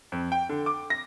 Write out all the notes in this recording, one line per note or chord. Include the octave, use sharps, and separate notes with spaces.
F2
G5
D3
D6
A#6